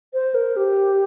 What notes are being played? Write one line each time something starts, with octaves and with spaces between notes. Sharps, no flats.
C5
A#4
G4